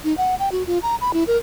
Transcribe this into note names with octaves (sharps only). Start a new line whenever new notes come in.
D#4
F#5
G5
F#4
F4
A#5
B5
E4
A#4